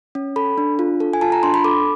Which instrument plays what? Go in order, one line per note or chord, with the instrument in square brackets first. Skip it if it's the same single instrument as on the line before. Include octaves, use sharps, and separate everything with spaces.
[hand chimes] C#4
A4 B5
D4
F4
A4
G#5
F4 A5
A#5
D4 C6
B5
A4 D6